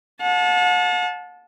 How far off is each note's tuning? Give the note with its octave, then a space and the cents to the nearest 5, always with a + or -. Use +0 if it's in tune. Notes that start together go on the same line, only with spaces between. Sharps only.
F#5 -45 A5 -20